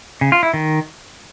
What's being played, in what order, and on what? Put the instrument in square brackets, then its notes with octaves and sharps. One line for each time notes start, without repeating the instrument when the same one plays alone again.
[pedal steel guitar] C#3
F4
E4
D#3